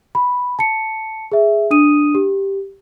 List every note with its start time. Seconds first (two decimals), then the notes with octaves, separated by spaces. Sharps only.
0.15 B5
0.59 A5 C#7
1.32 G#4 E5
1.71 D4 D#6 D#7
2.15 G4